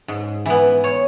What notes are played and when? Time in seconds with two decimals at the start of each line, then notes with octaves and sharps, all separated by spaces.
0.08 G#2
0.46 E3 B3
0.84 C#5